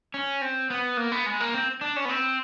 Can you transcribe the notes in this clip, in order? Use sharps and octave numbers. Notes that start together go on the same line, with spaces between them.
C#4
C4
B3
A#3
B3
G#3
A#3
C4
D4
C#4
B3
C4